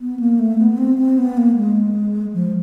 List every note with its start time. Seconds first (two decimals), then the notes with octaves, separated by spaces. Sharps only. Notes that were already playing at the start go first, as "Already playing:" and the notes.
0.01 B3
0.19 A#3
0.39 A3
0.58 B3
0.78 C4
0.98 C4
1.18 B3
1.37 A#3
1.56 G#3
2.34 F3